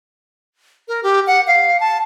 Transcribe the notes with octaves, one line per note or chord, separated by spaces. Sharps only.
A#4
G4
F#5
F5
A5